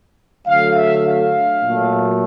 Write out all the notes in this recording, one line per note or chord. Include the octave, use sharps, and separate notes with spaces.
D3 F#3 A3 F5
E5
F5
A#2 F#3 A3